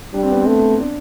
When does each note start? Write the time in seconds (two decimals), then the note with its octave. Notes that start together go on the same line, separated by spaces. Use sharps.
0.14 G3 D4
0.23 C4
0.32 B3
0.41 C4
0.47 A3
0.80 D4